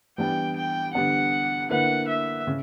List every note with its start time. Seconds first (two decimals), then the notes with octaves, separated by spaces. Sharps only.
0.18 E3 G3 B3 D4 G5
0.56 G5
0.94 D3 G3 B3 D4 F#5
1.70 D3 A#3 E4 B4 F#5
2.08 E5
2.47 C#3